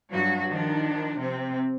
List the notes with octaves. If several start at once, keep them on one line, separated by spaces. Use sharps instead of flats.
G2 F#3 F#4
D#3 F3 D4
C3 C4